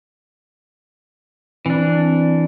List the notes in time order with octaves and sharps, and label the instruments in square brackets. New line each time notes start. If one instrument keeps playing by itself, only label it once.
[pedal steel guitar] E3 D4 [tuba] C4